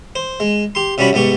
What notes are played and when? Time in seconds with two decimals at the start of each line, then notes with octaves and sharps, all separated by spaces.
0.15 C5
0.40 G#3
0.75 G4 C6
0.98 C3 G3 C#4 F#4 B5 D6
1.13 C2 G#2 B3 G4 C#6